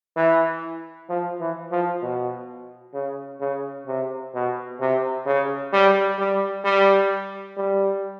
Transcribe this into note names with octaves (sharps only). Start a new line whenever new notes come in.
E3
F3
E3
F3
B2
C#3
C#3
C3
B2
C3
C#3
G3
G3
G3
G3